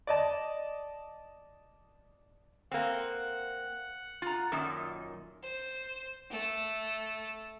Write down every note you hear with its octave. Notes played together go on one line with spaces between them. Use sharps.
D5 D#5 A5
A#3 C4 F#5
F4 A#5
F#2 A#2 D#3
C5
A3